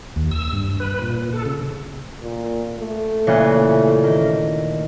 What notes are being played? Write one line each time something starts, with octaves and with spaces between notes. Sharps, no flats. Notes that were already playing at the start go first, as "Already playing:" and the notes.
D#2
E6
G2
B4
A#2
A4
C#3
A#2
A3
A#2 C#3 E3
D#3